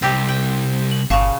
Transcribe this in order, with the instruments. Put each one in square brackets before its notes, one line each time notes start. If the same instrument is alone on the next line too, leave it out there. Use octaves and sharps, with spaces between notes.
[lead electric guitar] C2 [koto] C4 G4
[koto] G5
[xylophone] F#7
[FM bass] G1 [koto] A#2 C#3 [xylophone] F5 A5 C#6